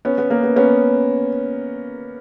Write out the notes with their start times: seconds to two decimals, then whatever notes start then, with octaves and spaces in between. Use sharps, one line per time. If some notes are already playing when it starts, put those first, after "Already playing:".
0.05 B3 C#4
0.18 B3
0.30 A#3
0.43 B3
0.56 B3 C#4